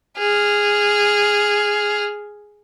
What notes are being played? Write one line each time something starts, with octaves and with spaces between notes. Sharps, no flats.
G#4 F6